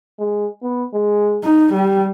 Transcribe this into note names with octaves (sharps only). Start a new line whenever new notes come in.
G#3
B3
G#3
D#4
G3 G4